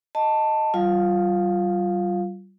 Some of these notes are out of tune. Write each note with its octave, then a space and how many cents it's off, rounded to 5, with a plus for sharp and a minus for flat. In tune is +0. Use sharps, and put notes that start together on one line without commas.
D#5 +0 A5 +10
G3 -40 F4 +0 F5 +10